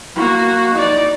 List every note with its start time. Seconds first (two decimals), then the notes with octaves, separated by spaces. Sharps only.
0.16 A#3 F#4
0.74 D#4 D5